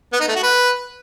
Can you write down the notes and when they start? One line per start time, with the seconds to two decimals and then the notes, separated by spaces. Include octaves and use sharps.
0.13 B3
0.20 D#4
0.28 A3
0.35 F#4
0.43 B4